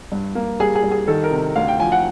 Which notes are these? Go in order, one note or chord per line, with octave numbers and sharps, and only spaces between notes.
G2
A#3
G3 G#4
G#4
G3
G#4
D#3 A4
A#4
C3
D2 F5
G5
F3 G#5
F#5